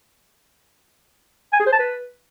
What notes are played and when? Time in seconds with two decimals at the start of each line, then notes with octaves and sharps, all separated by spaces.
1.53 G#5
1.60 G#4
1.66 C5
1.73 A5
1.79 B4